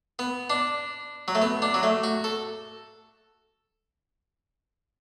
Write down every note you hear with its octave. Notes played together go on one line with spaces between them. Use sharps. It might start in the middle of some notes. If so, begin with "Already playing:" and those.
B3
D4
F#3
A3
B3
D4
F#3
A3
F#4
A4